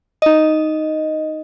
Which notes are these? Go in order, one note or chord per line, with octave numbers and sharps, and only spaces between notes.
D#4 D#5